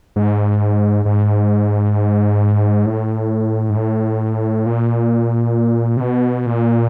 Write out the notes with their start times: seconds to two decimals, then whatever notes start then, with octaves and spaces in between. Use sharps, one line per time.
0.16 G#2
1.05 G#2
2.86 A2
3.69 G#2
3.76 A2
4.66 A#2
5.97 C3
6.01 B2
6.46 A#2